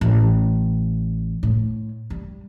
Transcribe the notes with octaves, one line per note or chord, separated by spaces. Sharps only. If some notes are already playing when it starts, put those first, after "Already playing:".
A1
A2
G3